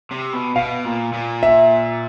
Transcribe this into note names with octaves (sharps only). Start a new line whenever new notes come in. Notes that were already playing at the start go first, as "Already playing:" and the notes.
C3
B2
B2 F5
A#2
A#2
E5